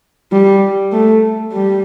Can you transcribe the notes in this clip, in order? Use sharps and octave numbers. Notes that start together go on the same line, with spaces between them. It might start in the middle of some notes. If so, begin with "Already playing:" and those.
G3
A3
G3